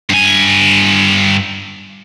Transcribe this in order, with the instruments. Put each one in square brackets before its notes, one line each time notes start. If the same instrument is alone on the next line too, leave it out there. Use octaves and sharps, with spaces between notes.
[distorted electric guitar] G2 G#5